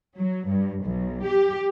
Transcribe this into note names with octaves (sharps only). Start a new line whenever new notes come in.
F#3
G2
B1
G4